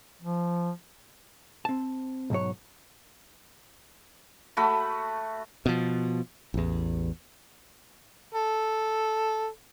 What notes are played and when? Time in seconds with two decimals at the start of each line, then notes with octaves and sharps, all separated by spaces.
0.22 F3
1.65 C4 A5
2.30 B1 G#2 F#3 C#5
4.57 A3 F#4 B5
5.66 B2 F3
6.54 A1 E2
8.35 A4